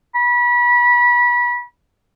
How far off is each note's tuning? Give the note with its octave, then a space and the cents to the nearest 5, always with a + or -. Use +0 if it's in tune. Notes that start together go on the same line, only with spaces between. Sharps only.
B5 -30